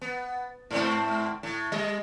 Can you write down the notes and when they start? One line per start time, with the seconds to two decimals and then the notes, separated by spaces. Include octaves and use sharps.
0.02 B3
0.71 G#2 A3 C4
1.43 A2
1.72 G3 D#5